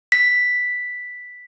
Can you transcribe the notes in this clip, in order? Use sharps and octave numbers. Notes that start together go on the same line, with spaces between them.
B6